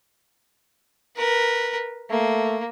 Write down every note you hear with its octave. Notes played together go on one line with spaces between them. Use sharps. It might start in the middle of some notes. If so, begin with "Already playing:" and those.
A#4 B4
A3 A#3